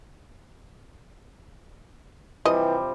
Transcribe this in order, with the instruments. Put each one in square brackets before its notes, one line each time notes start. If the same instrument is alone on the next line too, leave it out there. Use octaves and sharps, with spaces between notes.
[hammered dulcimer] C3 F3 G3 [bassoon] E3 [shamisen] D#5